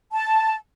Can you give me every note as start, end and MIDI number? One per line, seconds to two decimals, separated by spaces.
0.12 0.54 81